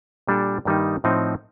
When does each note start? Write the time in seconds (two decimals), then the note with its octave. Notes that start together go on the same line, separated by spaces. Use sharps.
0.27 A#2 G3 D4 A4
0.65 G2 D#3 G3 A#3 D#4
1.04 A2 F3 C4 D#4